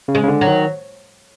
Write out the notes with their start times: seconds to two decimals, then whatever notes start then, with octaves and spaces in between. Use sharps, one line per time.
0.08 C#3
0.15 G#3
0.23 C#3
0.28 D3
0.41 F#3
0.47 D#3